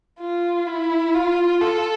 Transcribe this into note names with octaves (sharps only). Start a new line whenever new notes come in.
F4
E4
F4
A4